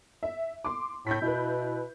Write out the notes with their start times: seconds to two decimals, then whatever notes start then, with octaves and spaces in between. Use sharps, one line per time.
0.23 E5
0.65 C6 D6
1.07 A2 G6 B6
1.22 B2 E4 B4